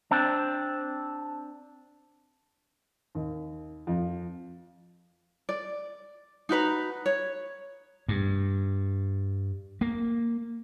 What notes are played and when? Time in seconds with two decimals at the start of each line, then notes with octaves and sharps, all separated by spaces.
0.11 C4 D4
3.15 D#2
3.87 F2
5.49 D5
6.49 D#4 F#4 B4 A#5
7.06 C#5
8.09 G2
9.81 A#3